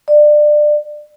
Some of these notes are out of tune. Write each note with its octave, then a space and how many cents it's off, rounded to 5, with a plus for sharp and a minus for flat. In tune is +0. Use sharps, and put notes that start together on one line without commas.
D5 +25